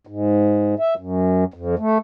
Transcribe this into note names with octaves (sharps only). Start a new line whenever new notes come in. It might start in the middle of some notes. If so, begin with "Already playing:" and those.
G#2
E5
F#2
F2
A3